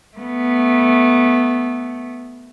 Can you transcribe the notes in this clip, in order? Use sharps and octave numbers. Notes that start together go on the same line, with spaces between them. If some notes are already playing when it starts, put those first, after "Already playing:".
A3 B3